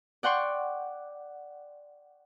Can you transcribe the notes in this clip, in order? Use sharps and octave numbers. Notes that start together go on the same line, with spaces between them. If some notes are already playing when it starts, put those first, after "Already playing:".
D5 F#5 G5 C6 C#6